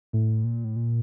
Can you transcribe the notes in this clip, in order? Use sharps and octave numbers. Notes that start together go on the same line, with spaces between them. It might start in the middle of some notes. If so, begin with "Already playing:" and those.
A2
A#2
A2
A#2